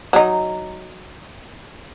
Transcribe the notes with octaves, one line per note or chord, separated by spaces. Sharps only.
F#3 D#4